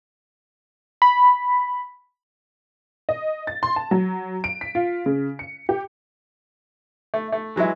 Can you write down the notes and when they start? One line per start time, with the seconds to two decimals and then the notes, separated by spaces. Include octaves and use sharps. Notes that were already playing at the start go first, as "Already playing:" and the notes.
1.02 B5
3.09 D#5
3.47 A6
3.63 C6
3.76 A5
3.91 F#3
4.44 D7
4.61 B6
4.75 F4
5.06 C#3
5.39 C#7
5.69 G4
7.14 A3
7.32 A3
7.56 E3 F#3 G#3 E4